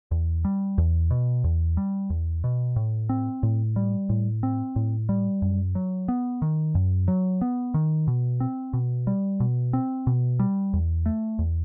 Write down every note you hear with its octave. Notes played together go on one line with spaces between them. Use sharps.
E2
G3
E2
B2
E2
G3
E2
B2
A2
C4
A2
G3
A2
C4
A2
G3
F#2
F#3
B3
D#3
F#2
F#3
B3
D#3
B2
C4
B2
G3
B2
C4
B2
G3
E2
A3
E2